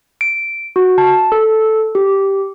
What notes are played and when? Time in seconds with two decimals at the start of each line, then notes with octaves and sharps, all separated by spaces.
0.21 D7
0.76 F#4
0.98 A5
1.32 A4
1.95 G4